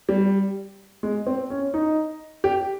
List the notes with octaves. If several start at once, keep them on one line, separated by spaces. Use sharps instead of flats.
G3
G#3
C4
C#4
D#4
G4